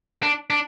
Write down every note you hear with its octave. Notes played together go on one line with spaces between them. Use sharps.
D4
D4